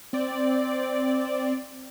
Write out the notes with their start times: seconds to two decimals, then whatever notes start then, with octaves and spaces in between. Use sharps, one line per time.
0.13 C4 D5